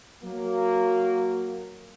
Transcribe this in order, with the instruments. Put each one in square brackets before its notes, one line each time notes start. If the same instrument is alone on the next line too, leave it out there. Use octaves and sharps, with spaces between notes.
[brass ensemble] F#3 A#3